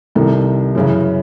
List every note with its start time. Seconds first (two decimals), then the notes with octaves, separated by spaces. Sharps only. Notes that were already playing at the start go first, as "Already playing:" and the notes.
0.15 C2 C3 D#3 A4
0.75 F#2 C#3 E3